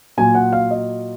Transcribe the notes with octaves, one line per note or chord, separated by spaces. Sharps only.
A#2 F#3 G#5
F#5
F5
D#5